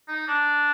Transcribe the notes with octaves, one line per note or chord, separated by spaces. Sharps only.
D#4
D4